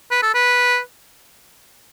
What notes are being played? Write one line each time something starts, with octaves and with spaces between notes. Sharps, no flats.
B4
A4
B4